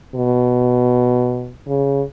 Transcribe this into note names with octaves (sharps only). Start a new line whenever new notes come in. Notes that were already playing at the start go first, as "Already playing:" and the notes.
B2
C#3